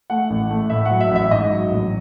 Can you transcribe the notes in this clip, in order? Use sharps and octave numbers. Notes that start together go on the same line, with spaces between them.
A3 F#5
A1
A3
A2 E5
F#5
F#3
E5
A1 E5
G#2 D#5
F#3
A1